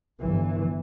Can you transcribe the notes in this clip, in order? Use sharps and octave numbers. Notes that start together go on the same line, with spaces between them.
G1 E3